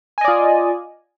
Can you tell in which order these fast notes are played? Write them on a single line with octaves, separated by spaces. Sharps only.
G#5 D#5 D5 F4